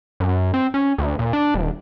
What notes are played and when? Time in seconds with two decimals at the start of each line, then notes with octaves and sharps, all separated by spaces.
0.20 F#2
0.54 C4
0.74 C#4
0.98 D2
1.19 A#2
1.33 D4
1.54 D#1